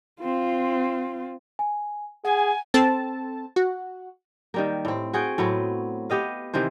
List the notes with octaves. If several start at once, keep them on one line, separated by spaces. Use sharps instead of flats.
C4 F4
G#5
G#4 F#5 G#5
C4 A4 A5
F#4
D#3 G3 A#3
A2 C4
F#4 G#4 F#5 G5
A2 F#3 B3 C4
B3 G4 D#5 F5
C3 D#3 E3 C5